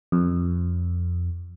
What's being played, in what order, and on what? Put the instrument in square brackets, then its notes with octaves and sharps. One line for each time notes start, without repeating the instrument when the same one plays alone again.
[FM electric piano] F2